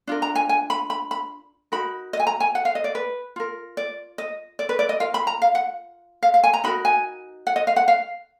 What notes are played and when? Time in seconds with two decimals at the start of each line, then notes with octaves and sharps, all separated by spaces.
0.07 D4 F4 A#4
0.22 A#5
0.35 G#5
0.49 G#5
0.70 B5
0.90 B5
1.11 B5
1.72 D#4 F#4 A#4 B5
2.13 D#5
2.20 G#5
2.27 A#5
2.40 G#5
2.55 F#5
2.65 F5
2.75 D#5
2.84 D5
2.95 B4
3.36 F4 A#4
3.77 D5
4.18 D#5
4.59 D5
4.69 B4
4.79 D5
4.89 D#5
5.00 F4 A#4 F5
5.14 B5
5.27 A#5
5.42 F5
5.55 F#5
6.23 F5
6.34 F5
6.44 G#5
6.53 A#5
6.64 D#4 F#4 A#4 B5
6.85 G#5
7.47 F#5
7.56 D#5
7.67 F5
7.76 F#5
7.88 F5